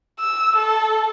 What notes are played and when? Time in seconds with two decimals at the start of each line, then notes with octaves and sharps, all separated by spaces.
0.20 E6
0.57 A4